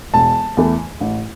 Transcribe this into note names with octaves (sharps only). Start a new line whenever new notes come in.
E1 A5
E2 E3 A3
A1